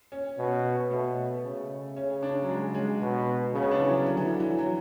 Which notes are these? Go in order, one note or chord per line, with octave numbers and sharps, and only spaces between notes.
C#4
B2
B2 A3
C#3
C#3 C#4
D4
F#3
G#3
G#3
B2
C#3 B3
C#4
D4
E3
F#3
D3 F#3
E3
E3
F#3